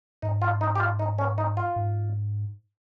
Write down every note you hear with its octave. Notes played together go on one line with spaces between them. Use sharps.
G#2 D#4
F4
D#4
G4
F4
D#4
C#4
D#4
F4
G#2